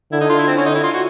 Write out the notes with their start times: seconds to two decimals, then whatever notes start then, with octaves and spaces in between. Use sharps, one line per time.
0.12 D3 E4
0.21 D#4
0.30 F4
0.39 E4
0.48 C4
0.57 C#4
0.66 D#4
0.75 E4
0.84 F4
0.94 F#4